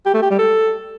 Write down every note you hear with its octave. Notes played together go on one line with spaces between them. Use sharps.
G4
A3
G4
G3
A4